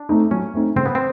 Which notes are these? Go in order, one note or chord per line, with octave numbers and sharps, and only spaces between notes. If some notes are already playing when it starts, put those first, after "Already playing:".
Already playing: D4
A3 C4 D#4
F#3 C#4
A3 C4 D#4
C#3 C4
B3
C4